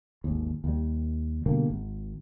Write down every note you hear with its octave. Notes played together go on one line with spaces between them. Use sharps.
G#1 D#2
D#2 G3
B2 D3 G3 A#3
G#1